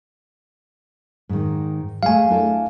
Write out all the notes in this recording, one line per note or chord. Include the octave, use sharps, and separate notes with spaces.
G#2 D#3
G#3 A3 F5 G#5
D4 E4 A4